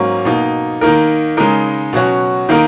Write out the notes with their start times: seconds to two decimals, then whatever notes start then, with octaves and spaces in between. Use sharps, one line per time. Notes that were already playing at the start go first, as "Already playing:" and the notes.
Already playing: G#2 F#3 A#3 C#4
0.25 B2 A#3 D#4
0.81 D#3 A#3 D#4 A#4
1.37 C#3 G#3 D#4 A#4
1.93 B2 F#3 C#4 F#4
2.49 D#3 A#3 D#4 A#4